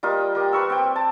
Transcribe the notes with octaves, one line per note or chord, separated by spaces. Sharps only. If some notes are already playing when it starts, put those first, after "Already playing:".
G3 F4 A#4 D#5
G4 A#4
B4 C#6 E6
C4 G5
A5